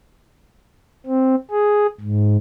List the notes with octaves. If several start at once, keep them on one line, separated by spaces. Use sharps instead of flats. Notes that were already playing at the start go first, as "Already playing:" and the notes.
C4
G#4
G#2